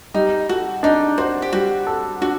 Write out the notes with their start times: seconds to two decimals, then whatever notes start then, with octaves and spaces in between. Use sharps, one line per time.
0.14 G3 D#4
0.49 F#4 A4
0.83 D4 D#4
1.18 F#4 C5
1.42 G4
1.53 G3 F#4
1.87 A4
2.21 D4 F#4